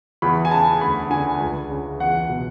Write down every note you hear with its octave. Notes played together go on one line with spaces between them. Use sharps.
E2 B5
G#5
C#3 A5
D2 B5
D3 G#5
C#2
C#3
E2 F#5
B2